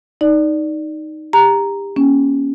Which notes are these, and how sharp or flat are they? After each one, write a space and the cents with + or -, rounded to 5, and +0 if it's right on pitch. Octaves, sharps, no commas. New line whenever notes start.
D#4 +0 D5 +0
G4 +25 A#5 +0
A#3 +35 C#4 +0